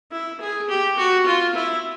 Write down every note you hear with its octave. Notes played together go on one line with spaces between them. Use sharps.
E4
G#4
G4
F#4
F4
E4